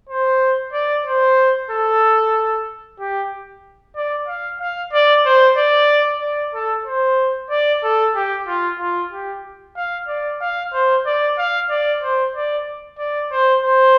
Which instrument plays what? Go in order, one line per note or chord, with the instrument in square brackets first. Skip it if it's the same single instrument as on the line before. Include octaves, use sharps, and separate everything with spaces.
[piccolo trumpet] C5
D5
C5
A4
G4
D5
F5
F5
D5
C5
D5
D5
A4
C5
D5
A4
G4
F4
F4
G4
F5
D5
F5
C5
D5
F5
D5
C5
D5
D5
C5
C5